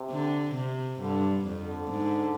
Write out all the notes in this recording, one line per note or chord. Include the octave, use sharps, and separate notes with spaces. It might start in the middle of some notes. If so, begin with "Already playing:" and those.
Already playing: C3
D3
C3
G2 D3
F2
D3
G#2